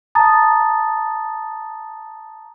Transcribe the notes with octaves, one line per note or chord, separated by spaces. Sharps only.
A5 A#5 D#6 A6